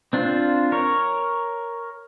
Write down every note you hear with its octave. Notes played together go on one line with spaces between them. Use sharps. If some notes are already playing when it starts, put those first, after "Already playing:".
C4 D4 F4 C5
A#4 C#5